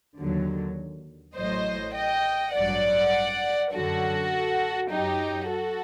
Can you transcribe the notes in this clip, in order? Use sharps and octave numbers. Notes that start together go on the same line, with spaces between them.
D#2 D3 F#3
A1 A2 F#3 C5 D#5
D#5 G5
A1 G2 F#3 D5 F#5
F#2 D3 F#3 F#4 A4
F#2 F#3 D#4 G4
F#4 A4